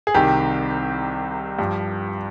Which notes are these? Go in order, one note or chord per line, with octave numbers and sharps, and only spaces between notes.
G#4
C2 C3 D#3 G4
G2 F3